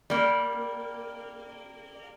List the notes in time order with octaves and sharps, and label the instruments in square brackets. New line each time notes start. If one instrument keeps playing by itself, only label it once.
[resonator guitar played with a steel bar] G3 A#3